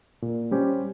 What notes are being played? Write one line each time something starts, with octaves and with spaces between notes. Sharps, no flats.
A#2
G3 C#4 G4 C5